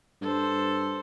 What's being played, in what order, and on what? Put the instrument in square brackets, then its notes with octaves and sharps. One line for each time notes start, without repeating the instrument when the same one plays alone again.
[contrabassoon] G2 [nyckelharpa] A4 C5